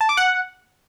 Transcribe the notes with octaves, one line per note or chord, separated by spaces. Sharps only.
A5
D6
F#5